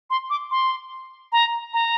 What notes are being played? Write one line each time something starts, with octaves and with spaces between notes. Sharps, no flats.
C6
D6
C6
A#5
A#5